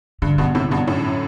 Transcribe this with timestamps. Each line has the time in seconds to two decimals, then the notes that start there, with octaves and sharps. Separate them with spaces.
0.22 G2 D3
0.38 G2 B2
0.55 A2 C3
0.71 G2 B2
0.88 F#2 A2